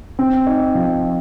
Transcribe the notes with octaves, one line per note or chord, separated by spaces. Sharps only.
C4
D#4
F3